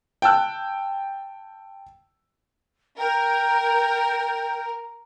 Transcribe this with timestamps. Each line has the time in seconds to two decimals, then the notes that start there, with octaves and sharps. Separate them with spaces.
0.22 G5 A5 E6 F#6
2.98 A#4 G5